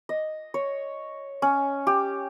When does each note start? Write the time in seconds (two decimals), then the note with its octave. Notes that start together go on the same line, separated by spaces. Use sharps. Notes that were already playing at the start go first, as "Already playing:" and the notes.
0.09 D#5
0.54 C#5
1.42 C#4
1.87 G4